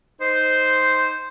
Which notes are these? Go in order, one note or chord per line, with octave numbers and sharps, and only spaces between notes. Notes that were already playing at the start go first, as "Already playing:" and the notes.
D#4 C5